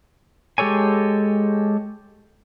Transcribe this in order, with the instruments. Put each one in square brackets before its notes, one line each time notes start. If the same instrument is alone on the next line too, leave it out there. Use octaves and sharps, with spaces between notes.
[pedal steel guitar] G#3 G4 A4 C#5 G#5